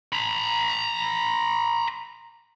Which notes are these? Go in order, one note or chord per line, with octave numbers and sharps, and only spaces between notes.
A#5 B5